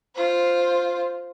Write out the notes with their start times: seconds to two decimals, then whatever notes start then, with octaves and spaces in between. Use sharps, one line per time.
0.15 F4 C5